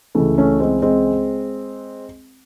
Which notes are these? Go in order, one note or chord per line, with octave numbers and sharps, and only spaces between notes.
C#2 C#3 E3 A3
A3 C#4
G#3 C4
G#3 C4